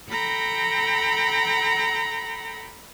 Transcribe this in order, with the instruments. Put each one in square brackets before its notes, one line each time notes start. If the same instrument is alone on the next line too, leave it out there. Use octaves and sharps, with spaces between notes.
[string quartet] A4 G5 A#5 B5 A#6